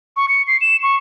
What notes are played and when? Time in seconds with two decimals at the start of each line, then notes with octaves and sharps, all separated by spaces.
0.16 C#6
0.28 C#7
0.47 C7
0.61 E7
0.83 C#6